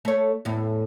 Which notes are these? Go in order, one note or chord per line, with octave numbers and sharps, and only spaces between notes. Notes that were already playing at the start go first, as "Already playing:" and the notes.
A3 C#5
E2 A2